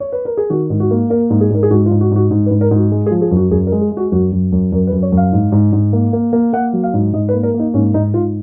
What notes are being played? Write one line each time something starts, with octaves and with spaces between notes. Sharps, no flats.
C#5
B4
A#4
G#4
D#3 F#4
G#2
F#4
A#3
A#3 A#4
G#2
G#4
G#2 A#4
G#4
G#2 F#4
F4
G#2
F#4
G#2 F#4
G#2
B4
G#2
A#4
G#2 F#4
G#3
G#4
F3
G#4
F#2
F#4
F#2 G#4
A#4
G#3
G#4
G#3
F#4
F#2 F#4
F#2
F#2
F#2 A#4
B4
F#2
C#5
F#2
F5
G#2
G#2
G#2
A#3
A#3
A#3
A#3 F#5
F#3
F5
G#2
G#2 D#5
B4
A#3
A#4
A#3
D#4
G#2 C#4
G#2 D#4
G#2 F4